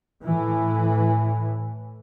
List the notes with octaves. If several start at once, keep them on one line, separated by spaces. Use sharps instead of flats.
A2 E3